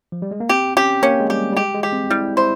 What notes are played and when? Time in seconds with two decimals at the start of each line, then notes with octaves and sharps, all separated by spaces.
0.12 F3
0.22 G3
0.31 G#3
0.40 A#3
0.49 C4 G4
0.77 C#4 G4
1.03 A#3 C#4
1.20 G#3
1.30 G3 G4
1.52 G3
1.57 G#3 G4
1.74 G#3
1.83 G4
1.92 C4
2.10 G3 E4
2.37 E4 C5